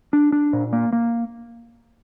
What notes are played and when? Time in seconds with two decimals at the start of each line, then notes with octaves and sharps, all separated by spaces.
0.13 D4
0.32 D4
0.53 A#2
0.73 A#3
0.93 A#3